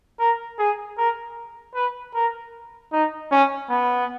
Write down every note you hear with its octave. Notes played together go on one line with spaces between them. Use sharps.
A#4
G#4
A#4
B4
A#4
D#4
C#4
B3